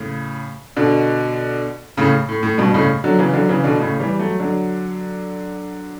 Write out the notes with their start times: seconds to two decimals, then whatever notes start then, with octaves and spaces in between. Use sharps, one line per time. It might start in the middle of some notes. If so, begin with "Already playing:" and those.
Already playing: A2 C#3
0.77 B2 D3
1.97 A2 C#3
2.29 A2
2.43 A2
2.58 G2 B2
2.74 A2 C#3
3.04 D3 F#3
3.18 C#3 E3
3.34 D3 F#3
3.49 C#3 E3
3.64 B2 D3
3.80 A2 C#3
4.00 E3 G3
4.19 F#3 A3
4.40 D3 F#3